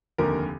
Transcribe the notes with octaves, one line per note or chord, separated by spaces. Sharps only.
F1 D#2 D3 A#4